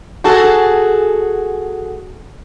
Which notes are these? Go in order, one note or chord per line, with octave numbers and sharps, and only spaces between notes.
F#4 G#4 A4